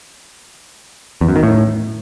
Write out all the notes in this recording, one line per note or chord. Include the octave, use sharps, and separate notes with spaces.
E2
F#2
D#3
A2